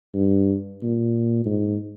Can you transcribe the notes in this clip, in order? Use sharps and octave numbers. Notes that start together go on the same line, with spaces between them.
G2
A#2
G#2